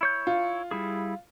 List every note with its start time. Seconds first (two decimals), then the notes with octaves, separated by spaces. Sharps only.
0.01 E4 C#5 G6
0.27 F4
0.71 G3 E4 G#4